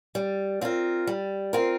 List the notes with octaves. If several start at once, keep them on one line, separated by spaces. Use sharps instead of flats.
G3
C4 F4 A#4
G3
C4 F4 A#4